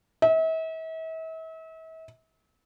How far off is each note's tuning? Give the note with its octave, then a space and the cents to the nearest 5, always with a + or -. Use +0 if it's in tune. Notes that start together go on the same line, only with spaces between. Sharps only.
E5 -40